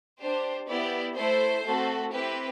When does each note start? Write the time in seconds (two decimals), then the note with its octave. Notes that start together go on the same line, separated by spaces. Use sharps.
0.19 D4 G4 C5
0.68 B3 E4 G4 D5
1.16 A3 E4 A4 C5
1.64 A3 C4 F#4 A4
2.13 C4 E4 G4 B4